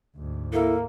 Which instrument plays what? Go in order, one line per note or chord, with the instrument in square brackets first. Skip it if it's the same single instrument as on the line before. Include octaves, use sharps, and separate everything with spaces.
[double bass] D2 G#2
[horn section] A#3 [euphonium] E4 [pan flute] A4